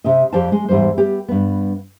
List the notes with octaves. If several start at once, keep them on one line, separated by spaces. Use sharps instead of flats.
C3 G4 D#5
F2 G4 C5 D5 F5 A5
G#3
E2 G#2 G3 G#3 C5
B3 G4
G2 B3